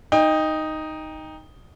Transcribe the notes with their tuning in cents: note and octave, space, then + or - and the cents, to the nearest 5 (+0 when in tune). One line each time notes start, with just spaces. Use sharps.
D#4 +0 G5 +25